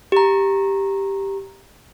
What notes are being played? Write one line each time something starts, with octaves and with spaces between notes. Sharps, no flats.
G4 A#5